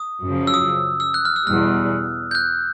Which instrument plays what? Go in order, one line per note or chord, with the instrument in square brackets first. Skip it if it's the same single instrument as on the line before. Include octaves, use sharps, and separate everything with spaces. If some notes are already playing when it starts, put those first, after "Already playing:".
Already playing: [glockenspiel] D#6
[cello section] F#2 C#3 F3
[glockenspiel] E6
D#6
E6
F#6
F6
E6
[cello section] E2 B2 G3 [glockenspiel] F6
[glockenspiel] G6
F#6